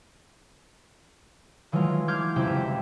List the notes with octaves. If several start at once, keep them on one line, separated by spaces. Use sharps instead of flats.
D#3 E3 F#3 G#3 A3 F4
D6 F6 G6 G#6 C7
F#1 F2 C3 E4 E5 G5